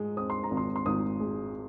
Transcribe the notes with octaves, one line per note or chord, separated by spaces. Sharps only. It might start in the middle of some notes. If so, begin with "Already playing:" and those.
Already playing: G#2 G#3 D#6
C4 D#6
C6
A#5
G#1
C6
C6
G#1 D#6
G#3